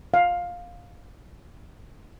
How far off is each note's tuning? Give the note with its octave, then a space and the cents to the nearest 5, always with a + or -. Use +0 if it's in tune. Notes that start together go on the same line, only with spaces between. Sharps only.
F5 +15